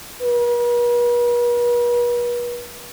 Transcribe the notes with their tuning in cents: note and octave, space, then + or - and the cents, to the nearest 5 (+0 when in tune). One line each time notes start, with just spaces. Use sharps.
B4 -45